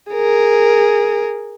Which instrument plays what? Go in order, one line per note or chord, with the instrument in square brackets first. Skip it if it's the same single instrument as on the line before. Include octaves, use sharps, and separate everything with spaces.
[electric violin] G#4 A#4